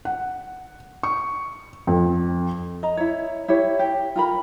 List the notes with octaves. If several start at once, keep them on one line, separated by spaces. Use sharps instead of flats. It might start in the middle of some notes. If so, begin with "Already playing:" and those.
F#5
C#6
F2
D#5 A#5
E4 C#5
E4 G4 C#5
G4
F4 A#4 B5